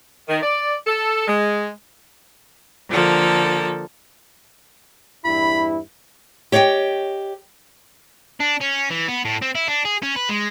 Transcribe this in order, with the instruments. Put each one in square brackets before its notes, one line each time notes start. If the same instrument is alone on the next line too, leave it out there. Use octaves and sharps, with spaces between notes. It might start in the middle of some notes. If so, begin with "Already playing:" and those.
[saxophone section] D#3
D5
A4
G#3
[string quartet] D3 F3 A#3 A4
[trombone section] E2 G2 E4 [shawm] B5
[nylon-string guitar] G4 C#5 D#5 F5 G5
[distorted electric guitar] D4
C#4
E3
B3
A2
C4
E4
D4
G#4
C#4
B4
G#3